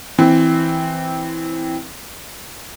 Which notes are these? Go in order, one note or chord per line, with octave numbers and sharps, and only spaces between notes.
E3 C4